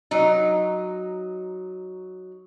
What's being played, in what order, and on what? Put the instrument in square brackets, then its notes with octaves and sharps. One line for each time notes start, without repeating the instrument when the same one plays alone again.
[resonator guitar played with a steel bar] F#3 D#4